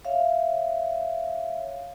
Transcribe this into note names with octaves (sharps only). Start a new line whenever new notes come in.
C#5 E5 F5